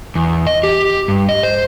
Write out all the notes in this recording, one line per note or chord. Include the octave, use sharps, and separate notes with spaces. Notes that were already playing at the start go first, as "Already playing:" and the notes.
E2
D#5
G4
G2
D#5
C5